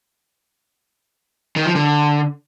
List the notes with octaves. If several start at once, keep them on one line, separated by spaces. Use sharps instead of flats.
D#3
F3
D3